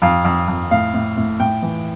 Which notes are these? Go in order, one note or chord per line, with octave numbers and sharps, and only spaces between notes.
F2 F5
F2
F2
A2 F5
A2
A2
A2 G5
E3